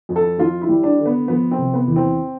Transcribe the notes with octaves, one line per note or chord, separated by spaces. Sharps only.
F2
A4
F2 F4
E4
G3
D4
D3
B3
F3 B3
C4
C3
B3
E2
C4